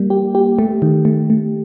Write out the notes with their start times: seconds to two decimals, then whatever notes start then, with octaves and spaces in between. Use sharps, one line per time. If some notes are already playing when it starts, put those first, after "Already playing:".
Already playing: G3 A#3
0.10 G4
0.35 G4
0.59 A3
0.82 D#3
1.05 A3
1.30 A3